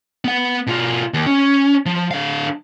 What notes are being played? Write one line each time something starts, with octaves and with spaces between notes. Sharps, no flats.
B3 F#5
B2 F4
D#2
C#4
F3
D3 F5